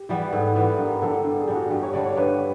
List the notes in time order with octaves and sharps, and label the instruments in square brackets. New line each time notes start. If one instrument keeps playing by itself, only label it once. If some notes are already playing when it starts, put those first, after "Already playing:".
Already playing: [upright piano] G4
[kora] E3 G3 B3 [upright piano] G#4
[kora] G#2 [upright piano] A4
[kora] E3 G3 B3 [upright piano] B4
[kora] G2 [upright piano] A#4
[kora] D3 G3 [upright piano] A4
[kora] G2
[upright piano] G#4
[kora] D3 G3
[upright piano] F#4
[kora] G2 [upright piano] G4
[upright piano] C#5
[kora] D3 G3 [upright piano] D5
[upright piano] C#5
[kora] G2 [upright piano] B4